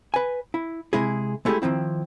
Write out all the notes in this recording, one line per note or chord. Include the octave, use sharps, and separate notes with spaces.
B4 G#5
E4
C3 G#3 E4 G#4
G#3 A3 E4 F4 G4 G#4
D#3 F3 C4 E4